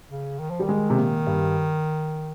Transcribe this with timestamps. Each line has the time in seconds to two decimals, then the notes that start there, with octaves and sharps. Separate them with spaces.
0.11 C#3
0.39 D#3
0.51 F3
0.60 D#3 G3
0.69 G#3
0.90 C3
0.98 A#2
1.27 G2